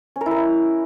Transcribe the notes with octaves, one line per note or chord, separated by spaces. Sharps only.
C#4
A#4
E4
A#4
E4